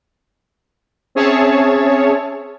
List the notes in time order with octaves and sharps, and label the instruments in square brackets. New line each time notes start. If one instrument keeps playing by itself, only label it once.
[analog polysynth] C4 C#4 G#4 C#5 E5 A5